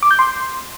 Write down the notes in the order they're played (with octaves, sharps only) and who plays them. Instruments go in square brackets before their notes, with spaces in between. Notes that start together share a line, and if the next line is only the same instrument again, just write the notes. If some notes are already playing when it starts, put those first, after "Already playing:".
[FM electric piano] D6
G6
C6